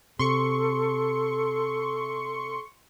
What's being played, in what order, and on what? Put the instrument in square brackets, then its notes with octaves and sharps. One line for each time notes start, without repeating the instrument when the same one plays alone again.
[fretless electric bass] C3 [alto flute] A4 [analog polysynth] C6 C#6 C#7